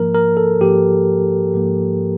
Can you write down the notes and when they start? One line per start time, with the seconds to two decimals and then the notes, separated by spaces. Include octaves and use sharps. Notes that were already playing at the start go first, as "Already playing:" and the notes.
Already playing: G#2 F3 A#3 A#4
0.14 A#4
0.37 A4
0.60 G#2 F3 A#3 G4
1.54 G#2 F3 A#3